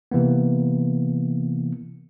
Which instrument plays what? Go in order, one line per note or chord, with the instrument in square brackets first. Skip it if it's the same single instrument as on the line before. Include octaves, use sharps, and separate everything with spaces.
[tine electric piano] C3 E3 A#3 B3